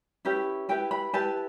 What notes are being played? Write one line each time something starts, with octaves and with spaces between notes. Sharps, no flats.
C#4 E4 G4 B4
E4 G4 B4 G5
B5
E4 G4 B4 A5